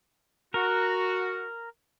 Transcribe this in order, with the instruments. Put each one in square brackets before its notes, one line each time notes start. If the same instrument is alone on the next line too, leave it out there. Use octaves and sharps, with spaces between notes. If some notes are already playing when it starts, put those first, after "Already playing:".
[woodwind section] F#4 [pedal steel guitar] A#4